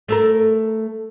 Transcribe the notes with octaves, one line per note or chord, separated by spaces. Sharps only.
A3 A4 A#4